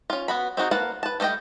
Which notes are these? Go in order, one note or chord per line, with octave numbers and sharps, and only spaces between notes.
C#4 F4
B3 F#4 B5
C4 D#4 F#4 G#4
A#3 B4 F5 F#5 A5
B4 A5
G3 A3 D#4 D#5 G5